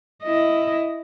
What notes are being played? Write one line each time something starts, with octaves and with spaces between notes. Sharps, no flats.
E4 D#5